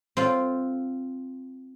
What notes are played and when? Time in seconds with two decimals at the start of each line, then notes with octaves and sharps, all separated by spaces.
0.17 C4 F4